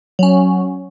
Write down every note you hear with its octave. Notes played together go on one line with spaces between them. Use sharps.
F#3 C#4